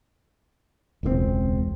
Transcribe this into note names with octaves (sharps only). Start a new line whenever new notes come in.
E1 C#2 D3 C4